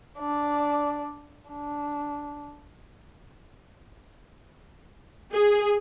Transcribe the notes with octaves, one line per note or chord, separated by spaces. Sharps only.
D4 D5
D4
G#4